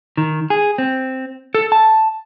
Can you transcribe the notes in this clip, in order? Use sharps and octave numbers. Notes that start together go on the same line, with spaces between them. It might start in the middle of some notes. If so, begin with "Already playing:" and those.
D#3
G#4
C4
A4
A5